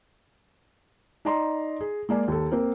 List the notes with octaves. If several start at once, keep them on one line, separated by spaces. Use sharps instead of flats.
D#4 D5 D#5 A#5 C6
G#4
G#3 A#3 D5 G#5
D#2 A4
A#3 C4 A#4